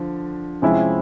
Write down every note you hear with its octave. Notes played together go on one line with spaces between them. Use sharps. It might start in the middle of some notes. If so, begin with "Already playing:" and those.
Already playing: D3 F3
C3 F3 G#3 C#4 E4